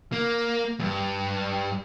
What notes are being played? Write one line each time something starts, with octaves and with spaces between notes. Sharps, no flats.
A#3
E2 G2